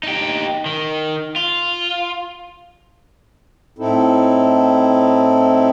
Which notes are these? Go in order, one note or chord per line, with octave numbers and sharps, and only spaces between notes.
D#4 G4
D#3
F4
A2 C4 D#4 E4 A4